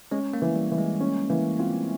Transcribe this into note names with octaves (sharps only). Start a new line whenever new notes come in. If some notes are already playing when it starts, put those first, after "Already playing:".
G#3 C#4
A#3
E3
G3
E3
G#3
C#4
E3 A#3
C4 F4